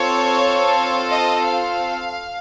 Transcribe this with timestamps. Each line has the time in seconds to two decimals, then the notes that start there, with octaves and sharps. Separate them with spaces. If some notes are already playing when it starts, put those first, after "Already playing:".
Already playing: C4 F4 A4 C#5
1.10 D#5
1.45 F5